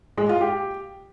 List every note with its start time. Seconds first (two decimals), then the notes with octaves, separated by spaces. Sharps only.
0.17 G#3
0.29 F4
0.41 G4